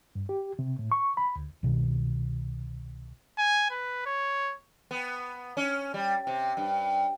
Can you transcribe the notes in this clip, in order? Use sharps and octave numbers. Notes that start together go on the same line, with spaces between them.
G2
G4
C3
A2
C#6
B5
D2
C2 B2 D#3
G#5
B4
C#5
B3
C#4
G3
C3
G2